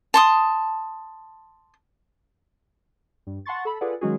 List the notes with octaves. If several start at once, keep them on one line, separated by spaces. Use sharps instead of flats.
A5 C6 D#6
G2
F#5 A5 C6 C#6 A6
A4 B5
F4 G#4 A4 B4 D5 F#5
D#3 F#3 G#3 C#4 F#4 G#4